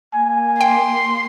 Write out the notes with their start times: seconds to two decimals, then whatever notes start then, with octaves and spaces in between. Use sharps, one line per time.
0.14 A#3 G#5
0.61 G5 C6